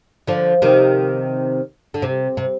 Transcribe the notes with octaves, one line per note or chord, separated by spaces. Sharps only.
D3 F3
C3 D#3
D3
C3
C3